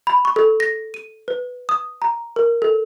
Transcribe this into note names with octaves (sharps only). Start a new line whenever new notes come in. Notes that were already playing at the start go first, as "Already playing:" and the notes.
B5
C#6
A4
A#6
D#7
B4
D#6
A#5
A#4
A4